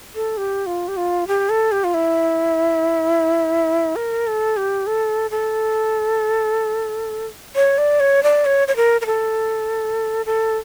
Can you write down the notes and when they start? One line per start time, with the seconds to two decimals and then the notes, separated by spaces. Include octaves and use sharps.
0.15 A4
0.37 G4
0.66 F4
0.88 G4
0.97 F4
1.27 G4
1.50 A4
1.72 G4
1.84 F4
1.94 E4
3.96 A#4
4.27 A4
4.57 G4
4.87 A4
5.31 A4
7.56 C#5
7.78 D5
8.00 C#5
8.23 D5
8.45 C#5
8.68 C#5
8.76 A#4
9.01 A#4
9.06 A4
10.26 A4